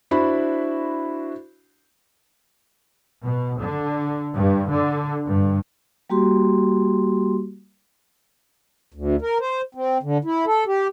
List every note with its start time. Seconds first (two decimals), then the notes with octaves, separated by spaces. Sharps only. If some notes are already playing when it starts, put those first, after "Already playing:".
0.11 D4 E4 F#4 C5 B5
3.23 B2
3.59 D3
4.35 G2
4.71 D3
5.27 G2
6.10 G3 A#3 F#4 G4 C6
8.94 D2
9.22 A#4
9.40 C5
9.75 C4
10.03 D3
10.25 E4
10.46 A4
10.67 G4